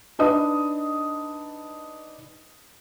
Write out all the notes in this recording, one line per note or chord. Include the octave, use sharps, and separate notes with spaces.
D4 D#4 B4 D#5 D#6